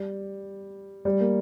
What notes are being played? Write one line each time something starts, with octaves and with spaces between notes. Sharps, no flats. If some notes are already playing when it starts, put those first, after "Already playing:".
Already playing: G3
G3
A#3